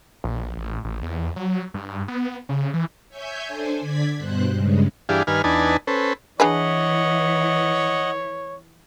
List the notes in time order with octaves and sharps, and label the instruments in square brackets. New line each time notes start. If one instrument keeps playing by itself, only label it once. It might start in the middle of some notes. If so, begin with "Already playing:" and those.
[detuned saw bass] A#1
A1
A1
E2
F#3
G2
B3
C#3
E3
[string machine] C#5 E5 G#5 G6
D4 A4 C5 G#5
D3 D5 G#6 B6
G2 B2 C5 F#6
G2 C#3 G#3
[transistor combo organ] G2 E3 D4 G4 G#4 F5
G2 D#3 B4 G#5 F6
E2 D4 D#4 B4 G#5 A5
C#4 A4 B4 C5
[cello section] E3 [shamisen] D4 G#4 B4 [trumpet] C#5 [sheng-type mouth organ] D#5 F#5